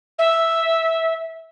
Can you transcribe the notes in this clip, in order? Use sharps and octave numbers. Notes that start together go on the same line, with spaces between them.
E5